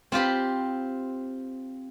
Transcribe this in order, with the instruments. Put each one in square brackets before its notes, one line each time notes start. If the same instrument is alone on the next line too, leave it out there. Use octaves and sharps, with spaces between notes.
[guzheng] C4 F4 G4 B5